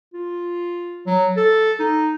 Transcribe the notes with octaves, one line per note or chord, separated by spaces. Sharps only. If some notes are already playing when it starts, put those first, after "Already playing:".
F4
F#3
A4
D#4